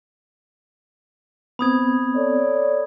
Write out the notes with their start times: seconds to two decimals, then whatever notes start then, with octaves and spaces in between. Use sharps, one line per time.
1.59 B3 C4 B5 D#6 G#6
2.16 A4 C#5 D5